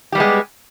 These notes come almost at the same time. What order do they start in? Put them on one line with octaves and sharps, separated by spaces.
G4 G3 B3 G#3